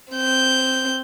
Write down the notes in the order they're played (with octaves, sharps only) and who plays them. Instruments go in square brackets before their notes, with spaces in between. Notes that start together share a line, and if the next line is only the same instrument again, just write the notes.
[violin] C4 G6